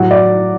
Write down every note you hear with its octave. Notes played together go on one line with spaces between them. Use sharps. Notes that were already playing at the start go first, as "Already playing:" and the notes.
Already playing: A2 F#3 F#4
D5